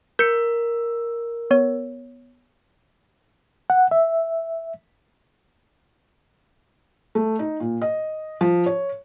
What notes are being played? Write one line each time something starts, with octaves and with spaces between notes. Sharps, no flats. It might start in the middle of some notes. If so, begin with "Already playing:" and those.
A#4 G6 C#7
B3 C#5
F#5
E5
A3
D#4
A#2
D#5
F3
C#5